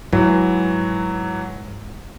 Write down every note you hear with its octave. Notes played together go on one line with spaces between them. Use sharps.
G#2 E3 F#3